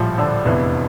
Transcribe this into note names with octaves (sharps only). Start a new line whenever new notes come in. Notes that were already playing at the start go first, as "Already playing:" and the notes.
Already playing: A#1 A2 F3 G3 F4
D3 D4
F1 E2 E3